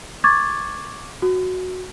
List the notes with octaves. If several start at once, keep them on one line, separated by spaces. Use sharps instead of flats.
C#6 D6 G#6 A6
F#4